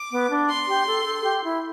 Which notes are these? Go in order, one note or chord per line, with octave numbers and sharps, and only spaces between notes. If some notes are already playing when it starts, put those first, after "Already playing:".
Already playing: D6
B3
D4
C6
G4
A4
A4
G4
E4